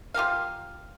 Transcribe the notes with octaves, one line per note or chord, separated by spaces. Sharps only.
F4 G4 A#4 F5